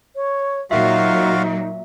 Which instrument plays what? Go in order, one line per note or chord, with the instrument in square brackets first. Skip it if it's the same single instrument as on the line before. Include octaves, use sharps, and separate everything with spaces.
[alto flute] C#5
[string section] A#2 F#3 [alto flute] D#4 [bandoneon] F4 F#4 F5 [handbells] E5